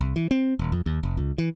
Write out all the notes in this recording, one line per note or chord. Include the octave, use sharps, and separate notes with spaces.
C2
E3
C4
D#1
F2
D#2
F1
C#2
E3